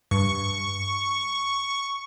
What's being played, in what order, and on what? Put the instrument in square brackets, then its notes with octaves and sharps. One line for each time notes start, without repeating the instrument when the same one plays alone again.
[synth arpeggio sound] G2 [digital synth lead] C#6